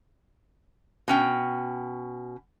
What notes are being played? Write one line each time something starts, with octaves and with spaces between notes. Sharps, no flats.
B2 C#4 G5